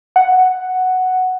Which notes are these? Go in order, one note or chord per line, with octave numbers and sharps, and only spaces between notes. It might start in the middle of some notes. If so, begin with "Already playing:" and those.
F#5